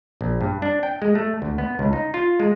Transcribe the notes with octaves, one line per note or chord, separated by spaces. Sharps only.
A#1
G2
D4
G5
G#3
A3
D2
B3
C#2
D#4
F4
G#3